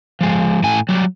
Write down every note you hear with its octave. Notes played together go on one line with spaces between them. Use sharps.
F3 G#3
A2 G#5
F#3 G3